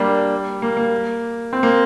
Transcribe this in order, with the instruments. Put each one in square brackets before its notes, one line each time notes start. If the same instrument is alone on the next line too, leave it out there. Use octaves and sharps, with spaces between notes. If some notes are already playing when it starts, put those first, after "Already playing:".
Already playing: [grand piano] G3 A#3 D4
A#3
A#3
C4
A#3